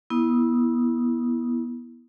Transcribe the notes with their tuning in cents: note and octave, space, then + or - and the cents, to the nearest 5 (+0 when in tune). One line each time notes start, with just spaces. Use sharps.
B3 -25 E4 -5 D#6 +0